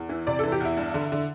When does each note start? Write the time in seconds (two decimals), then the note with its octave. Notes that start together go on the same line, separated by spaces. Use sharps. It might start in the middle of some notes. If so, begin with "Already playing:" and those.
Already playing: E2
0.09 E3
0.27 C3 D5
0.39 E3 A4
0.52 G4
0.60 E2 E4
0.77 G2
0.94 D3
1.12 D3